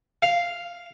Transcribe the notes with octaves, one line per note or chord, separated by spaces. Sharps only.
F5